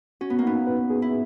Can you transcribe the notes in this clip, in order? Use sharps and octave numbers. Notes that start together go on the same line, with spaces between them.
C#4 F#4
B3
A#3
B3 D#4
B4
G#4
E4